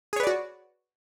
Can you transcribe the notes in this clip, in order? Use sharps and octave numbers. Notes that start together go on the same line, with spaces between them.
F#4 G#4 B4 C#5 D5